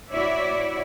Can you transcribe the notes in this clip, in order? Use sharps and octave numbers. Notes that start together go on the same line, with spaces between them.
E4 F#4 C#5 D5 E5